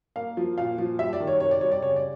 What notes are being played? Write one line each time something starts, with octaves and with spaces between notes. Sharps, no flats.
A#3 F5
F3
A#2 F5
F3
G3 E5
D5
D#3
C#5
C3 C#5
D5
G3 C#5
D5
C#3 C#5
D5